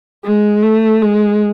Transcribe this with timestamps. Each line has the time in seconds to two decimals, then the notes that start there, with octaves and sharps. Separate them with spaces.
0.25 G#3
0.63 A3
1.01 G#3